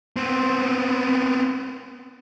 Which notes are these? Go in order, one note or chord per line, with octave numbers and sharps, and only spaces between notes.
B3 C4